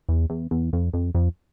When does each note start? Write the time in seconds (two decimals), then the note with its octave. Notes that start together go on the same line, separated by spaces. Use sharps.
0.09 E2
0.30 E2
0.51 E2
0.73 F2
0.93 F2
1.15 F2